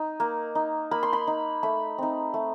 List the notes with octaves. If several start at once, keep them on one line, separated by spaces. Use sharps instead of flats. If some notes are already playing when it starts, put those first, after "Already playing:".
Already playing: D#4
A#3
D#4
A#3 B5
C6
B5
D#4
A3 B5
C4 D#4
A3